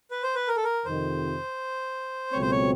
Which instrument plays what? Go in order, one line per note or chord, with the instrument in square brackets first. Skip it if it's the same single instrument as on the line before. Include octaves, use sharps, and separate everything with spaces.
[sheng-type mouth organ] B4
C5
B4
A#4
A4
A#4
[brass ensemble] F2 C3 D#3 [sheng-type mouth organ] C5
[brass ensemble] C#2 B2 F#3 A3 C4 [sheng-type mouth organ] C#5
[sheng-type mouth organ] C5
C#5